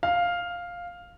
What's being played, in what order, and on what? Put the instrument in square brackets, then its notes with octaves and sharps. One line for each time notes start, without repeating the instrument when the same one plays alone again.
[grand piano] F5